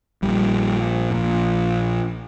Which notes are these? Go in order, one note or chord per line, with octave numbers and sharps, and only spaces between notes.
A#1 A#2 G3
A#1 A#2